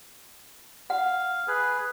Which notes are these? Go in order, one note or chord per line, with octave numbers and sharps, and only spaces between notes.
F5 F#5
G#4 B4